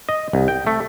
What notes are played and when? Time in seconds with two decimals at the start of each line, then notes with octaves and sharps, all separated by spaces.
0.09 D#5
0.33 C2
0.48 G5
0.67 A3